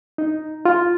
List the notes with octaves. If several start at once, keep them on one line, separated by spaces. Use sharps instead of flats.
D#4
F4